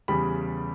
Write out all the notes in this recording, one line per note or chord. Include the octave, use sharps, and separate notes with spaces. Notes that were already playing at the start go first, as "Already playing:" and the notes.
E2 C#3 G3 B5